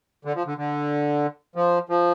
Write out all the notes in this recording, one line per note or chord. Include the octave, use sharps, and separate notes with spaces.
D3
F3
D3
D3
F3
F3